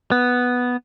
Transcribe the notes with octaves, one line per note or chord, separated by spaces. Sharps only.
B3